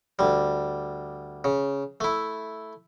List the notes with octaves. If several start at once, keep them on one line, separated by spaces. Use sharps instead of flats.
D2 G3
C#3
A3 E4